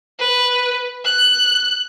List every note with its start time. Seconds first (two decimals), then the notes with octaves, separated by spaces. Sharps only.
0.19 B4
1.05 F#6